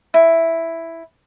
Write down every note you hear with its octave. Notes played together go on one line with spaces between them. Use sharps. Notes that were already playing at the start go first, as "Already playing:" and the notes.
E4